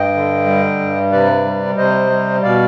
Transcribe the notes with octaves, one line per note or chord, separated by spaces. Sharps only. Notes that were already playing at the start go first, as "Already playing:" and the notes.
Already playing: G2 D#5 G5
D3
G3
G2
C3 B4 D5
G3
C3 C5 D#5
G3
B2 D5 F5